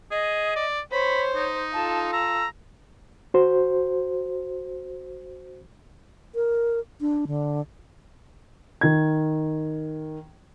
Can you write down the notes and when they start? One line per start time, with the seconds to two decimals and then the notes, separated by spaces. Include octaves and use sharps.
0.11 G#4 D#5
0.56 D5
0.92 C5 C#5 B5
1.36 D#4
1.74 F4 A4 A5
2.13 A#5 E6
3.34 F#4 C5
6.35 A#4
7.00 D4
7.27 D3
8.81 D#3 G#6